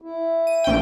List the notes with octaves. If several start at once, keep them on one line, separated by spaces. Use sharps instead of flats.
E4
D#7
A#1 G5